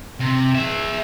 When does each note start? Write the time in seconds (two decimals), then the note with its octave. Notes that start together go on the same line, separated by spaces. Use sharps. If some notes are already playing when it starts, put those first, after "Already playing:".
0.20 C3
0.55 G#4 E5